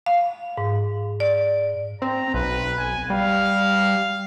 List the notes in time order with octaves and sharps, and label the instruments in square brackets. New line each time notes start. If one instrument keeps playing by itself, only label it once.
[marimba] F5
G#2
D5
[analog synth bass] C4 [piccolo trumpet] A#5
[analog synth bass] B1 [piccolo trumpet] B4
[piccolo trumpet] G#5
[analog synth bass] G3 [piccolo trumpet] F5